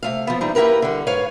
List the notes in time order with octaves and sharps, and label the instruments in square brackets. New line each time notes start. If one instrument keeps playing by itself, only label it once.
[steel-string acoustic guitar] C3 A3 F5
F3 B3
E3 F3 G3 D#4
A#3 E4 G4 A#4 B4
D3 G3
G#2 B4 C#5 F5